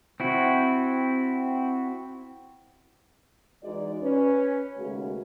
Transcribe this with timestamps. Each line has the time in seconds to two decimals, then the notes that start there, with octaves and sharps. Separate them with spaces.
0.20 C4 E4 F#4
3.63 E3 G#3 D#4 F#4 D5
4.01 C#4 B4
4.77 D#2 C#3 G#3 A3 F#4